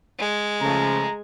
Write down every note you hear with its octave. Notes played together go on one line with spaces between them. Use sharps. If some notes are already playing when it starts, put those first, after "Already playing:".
G#3
C#3 F3 A3 A#5